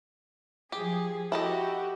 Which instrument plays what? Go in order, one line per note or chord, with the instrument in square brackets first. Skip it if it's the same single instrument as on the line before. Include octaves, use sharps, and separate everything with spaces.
[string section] F3 G#4 [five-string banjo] G4
[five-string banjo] E4 A4 D#5 [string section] F#4 G4